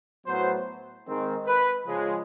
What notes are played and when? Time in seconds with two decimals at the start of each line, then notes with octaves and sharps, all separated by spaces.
0.26 A2 F#3 B3 C5
1.06 D#3 G#3 C4
1.47 B4
1.86 C#3 F3 G#3